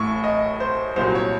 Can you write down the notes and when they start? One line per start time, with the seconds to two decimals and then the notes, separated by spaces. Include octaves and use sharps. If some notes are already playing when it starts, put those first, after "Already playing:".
Already playing: A1 A2 C#6
0.24 D#5
0.60 C5
0.96 C2 A#2 F#3 C5
1.15 C#5